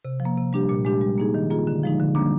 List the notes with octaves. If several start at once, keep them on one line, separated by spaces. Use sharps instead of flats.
C3
F3
A#3
C3
G3 D4 G4
A#2
G#3 D4 G4
G3
A#3 D#4 G#4
D#3
A#3 F4 G#4
D3
F3 G#3 D#4
D3
G3 A#3 D4